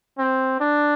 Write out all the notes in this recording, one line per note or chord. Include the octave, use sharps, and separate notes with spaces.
C4
D4